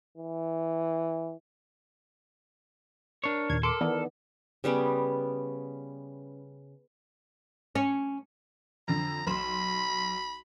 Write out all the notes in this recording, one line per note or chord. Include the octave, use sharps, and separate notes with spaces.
E3
D4 A#4 C#5
D#2 A#2 G#6
A4 A#4 C6 D6
D#3 E3 B3 D5
C#3 G3 B3 C#4
C#4
F2 D3 A#5
B1 B5 C6 E7